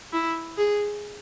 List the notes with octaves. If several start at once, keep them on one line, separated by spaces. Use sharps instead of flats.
E4
G#4